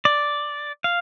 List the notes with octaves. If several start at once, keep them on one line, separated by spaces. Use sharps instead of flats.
D5
F5